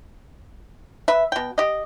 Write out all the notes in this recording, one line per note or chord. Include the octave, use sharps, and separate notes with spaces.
B4 E5
B2 G5
G4 D#5